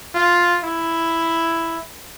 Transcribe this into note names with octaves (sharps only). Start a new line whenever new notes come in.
F4
E4